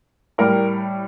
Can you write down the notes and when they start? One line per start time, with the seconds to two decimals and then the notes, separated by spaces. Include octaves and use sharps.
0.38 A2 G3 A#4